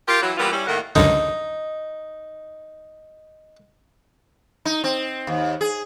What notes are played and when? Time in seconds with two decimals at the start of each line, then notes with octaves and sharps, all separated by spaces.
0.08 F4 G4 A#4
0.22 E3 F#3
0.38 E3 G3 A#3 B3 F4
0.52 G3 C#4 E4
0.67 A2 D#3 A3 A#3 A#4 F#5
0.95 C#2 F#2 D3 D#4
4.65 D#4
4.84 C4
5.27 D#2
5.61 G#4